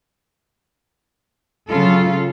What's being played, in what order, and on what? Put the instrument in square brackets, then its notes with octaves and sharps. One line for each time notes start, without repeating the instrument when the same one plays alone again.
[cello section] C#3 F#3 F4 A4